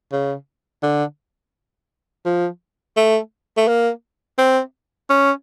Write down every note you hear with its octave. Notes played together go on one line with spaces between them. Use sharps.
C#3
D3
F3
A3
A3
A#3
C4
C#4